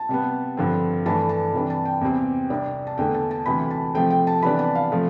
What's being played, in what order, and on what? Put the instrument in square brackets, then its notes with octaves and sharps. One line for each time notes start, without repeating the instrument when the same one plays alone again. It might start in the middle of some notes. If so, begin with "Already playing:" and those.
Already playing: [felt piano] A5
C3 G3 B3
G2 D3 F3 C4
G2 E3 A3 D4 A5
A5
C3 E3 G3 D4
A5
G5
E2 C3 G3 C4
C2 C3 G3 D4
A5
E2 D3 A3 G5
A5
A5
D2 C3 E3 G3 B5
A5
C3 F3 A3 C4 G5
G5
A5
C3 E3 G3 B3 D4 B5
A5
F5
C3 F3 A3